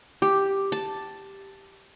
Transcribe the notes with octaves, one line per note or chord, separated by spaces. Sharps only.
G4
A5